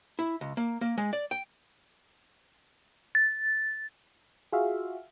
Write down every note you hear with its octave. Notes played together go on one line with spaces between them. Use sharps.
E4
C#2
A#3
A#3
G#3
D5
G5
A6
F4 F#4 G#4 E5 F5